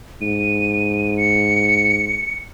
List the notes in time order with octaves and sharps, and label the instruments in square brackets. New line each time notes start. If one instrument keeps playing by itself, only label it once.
[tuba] G#2 [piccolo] D#7
[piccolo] C#7